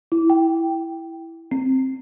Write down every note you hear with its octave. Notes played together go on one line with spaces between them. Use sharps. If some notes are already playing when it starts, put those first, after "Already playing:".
E4
G5
C4